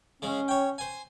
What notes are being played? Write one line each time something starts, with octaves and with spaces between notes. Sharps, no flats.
C#3 G#3 C#4
C#5 G5
C5 G#5